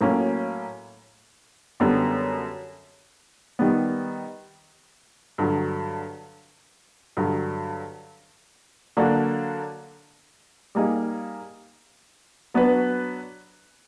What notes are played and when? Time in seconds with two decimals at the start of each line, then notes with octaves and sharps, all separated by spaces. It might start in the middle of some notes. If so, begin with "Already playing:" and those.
0.01 A2 F#3 A#3 C#4
1.80 F#2 D3 G3 B3
3.59 D#3 G3 B3
5.38 G2 D3 F#3
7.17 G2 D3 F#3
8.97 D3 F#3 A#3 D4 F#4
10.75 G3 A#3 D#4 G#4
12.54 F#3 B3 D4 F#4 B4